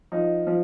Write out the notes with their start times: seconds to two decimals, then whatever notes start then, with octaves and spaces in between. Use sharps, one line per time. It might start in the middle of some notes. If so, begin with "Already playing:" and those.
0.12 F3 D#4
0.47 F3